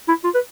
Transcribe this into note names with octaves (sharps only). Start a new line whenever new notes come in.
E4
F4
B4